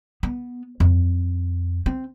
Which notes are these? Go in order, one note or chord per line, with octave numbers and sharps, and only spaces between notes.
B3
F2
C4